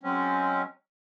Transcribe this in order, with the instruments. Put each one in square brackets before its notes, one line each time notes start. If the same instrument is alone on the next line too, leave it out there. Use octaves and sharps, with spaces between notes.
[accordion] F#3 G#3 C4 C#4